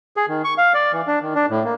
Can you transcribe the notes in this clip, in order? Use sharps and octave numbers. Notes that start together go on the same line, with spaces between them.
G#4
D#3
C#6
F5
D5
E3
D4
D#3
D4
A2
A#3